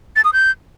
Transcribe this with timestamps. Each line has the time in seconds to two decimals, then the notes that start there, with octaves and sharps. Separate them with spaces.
0.16 A6
0.24 D#6
0.33 G6